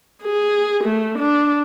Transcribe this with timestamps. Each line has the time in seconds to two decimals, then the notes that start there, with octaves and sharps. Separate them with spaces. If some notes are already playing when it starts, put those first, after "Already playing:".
0.22 G#4
0.84 A3
1.19 D4